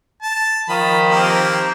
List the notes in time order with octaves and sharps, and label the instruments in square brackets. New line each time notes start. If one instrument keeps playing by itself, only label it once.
[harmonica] A5
[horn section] D#3 F3 [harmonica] B5
[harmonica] A#3 C4 G4